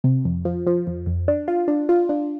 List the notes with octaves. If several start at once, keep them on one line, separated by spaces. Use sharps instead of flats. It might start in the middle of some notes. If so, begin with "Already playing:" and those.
C3
F2
F3
F3
F2
F2
D4
F4
D4
F4
D4